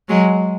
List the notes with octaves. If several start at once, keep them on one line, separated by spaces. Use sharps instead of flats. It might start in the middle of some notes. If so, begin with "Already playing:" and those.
F#3 G#3